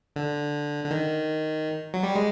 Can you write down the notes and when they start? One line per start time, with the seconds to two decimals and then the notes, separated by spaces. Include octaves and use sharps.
0.16 D3
0.84 D3
0.91 D#3
1.94 F#3
2.03 G3
2.15 G#3